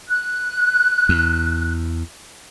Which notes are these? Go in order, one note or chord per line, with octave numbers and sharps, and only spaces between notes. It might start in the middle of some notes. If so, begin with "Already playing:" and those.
F#6
E2